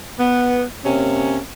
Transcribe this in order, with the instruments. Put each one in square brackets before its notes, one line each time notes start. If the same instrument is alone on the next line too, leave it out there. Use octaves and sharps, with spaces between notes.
[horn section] B3
C3 A#3 C#4